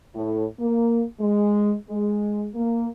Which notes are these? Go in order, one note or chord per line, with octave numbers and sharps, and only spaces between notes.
A2
A#3
G#3
G#3
A#3